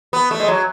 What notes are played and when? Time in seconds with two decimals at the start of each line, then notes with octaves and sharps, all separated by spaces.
0.13 B3
0.31 A3
0.40 G#3
0.48 F#3